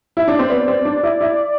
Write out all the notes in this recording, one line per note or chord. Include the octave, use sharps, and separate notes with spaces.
E4
D4
C4
B3 D5
C4
D4
E4
E4